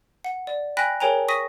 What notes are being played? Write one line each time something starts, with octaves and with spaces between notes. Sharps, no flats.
F#5
D5
G5 G#5 B5 F#6 A#6 B6
G#4 A#4 C#5 G5 G#5 A#5
C#6 D#6 A#6 B6 D#7